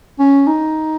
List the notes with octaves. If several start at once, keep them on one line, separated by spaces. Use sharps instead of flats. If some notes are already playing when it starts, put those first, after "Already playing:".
C#4
D#4